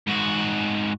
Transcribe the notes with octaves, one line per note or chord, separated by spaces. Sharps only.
G#2 F#4